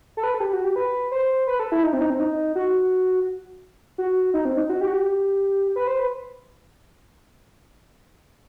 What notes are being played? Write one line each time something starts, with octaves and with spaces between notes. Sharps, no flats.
A4
B4
A4
G4
F#4
G4
B4
C5
B4
A4
E4
D#4
C4
D#4
C4
D#4
F#4
F#4
D#4
C4
D#4
F#4
G4
F#4
G4
B4
C5
B4